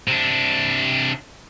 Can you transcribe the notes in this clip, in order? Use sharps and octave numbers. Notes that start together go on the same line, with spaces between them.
C3 D4